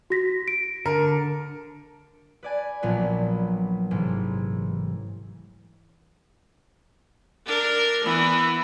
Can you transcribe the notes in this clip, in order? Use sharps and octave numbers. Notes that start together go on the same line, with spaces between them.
F#4 A#6 B6
D7
D3 A#4
B4 D5 G#5
A#1 A#2 F#3 B3 B4
A1 G#2 C3 E3
D4 A#4
E3 B3